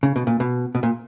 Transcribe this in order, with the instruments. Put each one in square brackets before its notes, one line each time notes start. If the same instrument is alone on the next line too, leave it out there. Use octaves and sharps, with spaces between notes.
[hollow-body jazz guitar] C#3
B2
A#2
B2
B2
A#2